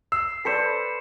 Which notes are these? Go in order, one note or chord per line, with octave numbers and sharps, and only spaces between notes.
E6 C7
A4 B4 C5 D5 B6 C#7 E7